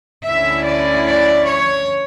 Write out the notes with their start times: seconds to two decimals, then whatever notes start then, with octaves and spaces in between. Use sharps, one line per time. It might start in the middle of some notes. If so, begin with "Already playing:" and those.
0.25 D2 D3 A3 C#4 E4 E5
0.65 D5
1.07 D5
1.47 C#5